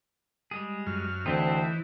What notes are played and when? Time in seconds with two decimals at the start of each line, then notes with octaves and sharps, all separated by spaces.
0.51 G3 G#3 G#4
0.87 F#2 F6
1.26 D2 E3 C4 D#4 E4 C5